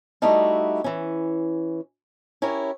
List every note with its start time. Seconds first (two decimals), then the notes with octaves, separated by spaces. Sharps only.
0.22 G3 A3 D#4 E4 F#4
0.84 E3 C#4
2.42 C#4 E4 G4 A#4 C#5